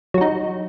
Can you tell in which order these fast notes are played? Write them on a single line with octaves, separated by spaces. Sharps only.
F#3 F#4 D#4